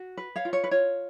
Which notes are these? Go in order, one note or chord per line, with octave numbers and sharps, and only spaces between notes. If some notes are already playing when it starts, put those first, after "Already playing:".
Already playing: F#4
B4
C#5 F5
F4
C#5
B4
F4 C#5